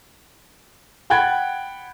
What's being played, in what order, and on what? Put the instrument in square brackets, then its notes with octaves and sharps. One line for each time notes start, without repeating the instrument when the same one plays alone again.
[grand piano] F#5 G5 B5 F#6 G#6 A6